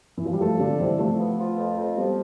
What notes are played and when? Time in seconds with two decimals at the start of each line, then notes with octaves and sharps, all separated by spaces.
0.18 E3
0.25 F3
0.33 G3
0.41 F3 A3 A4
0.60 D3 F3 D4
0.79 C3 E3 G3
0.99 C3 F3 A3
1.19 B3
1.39 F4
1.58 F2
1.77 F2
1.97 F3 G3 B3